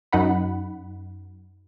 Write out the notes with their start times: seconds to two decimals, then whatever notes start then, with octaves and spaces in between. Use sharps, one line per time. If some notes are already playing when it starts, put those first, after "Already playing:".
0.13 F#2 D#4 F#5 B5